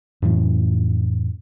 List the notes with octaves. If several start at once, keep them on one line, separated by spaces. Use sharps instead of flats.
F2 A2 E3 C#4